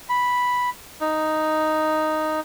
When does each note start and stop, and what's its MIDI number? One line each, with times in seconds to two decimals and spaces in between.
0.09 0.70 83
1.01 2.40 63